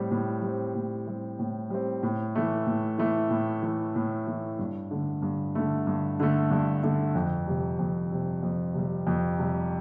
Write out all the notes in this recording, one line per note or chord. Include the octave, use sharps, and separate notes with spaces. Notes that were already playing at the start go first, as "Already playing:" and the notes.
Already playing: A2 G3 C4
A2
G3 C4
A2
G3 C4
A2
G3 C4
A2
E3 A3
A2
E3 A3
A2
E3 A3
A2
E3 A3
G2
D3 A3
G2
D3 A3
G2
D3 A3
G2
D3 A3
F2
C3 G3
F2
C3 G3
F2
C3 G3
F2
C3 G3